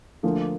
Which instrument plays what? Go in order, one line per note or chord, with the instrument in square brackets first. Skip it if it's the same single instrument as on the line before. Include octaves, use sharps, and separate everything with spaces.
[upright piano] D2 D3 F3 A#3